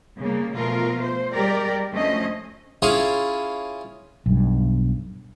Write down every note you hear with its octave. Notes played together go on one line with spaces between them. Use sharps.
C#3 G3 A#3
B2 F3 A3 F4 A#4
C5
G3 G#3 G4 A#4 D5
D2 F3 A3 C#4 C5 D#5
C#4 E4 F4 G#4 C#5
B1 G2